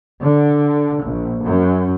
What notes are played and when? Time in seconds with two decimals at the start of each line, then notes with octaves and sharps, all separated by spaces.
0.21 D3
1.02 A#1
1.44 F#2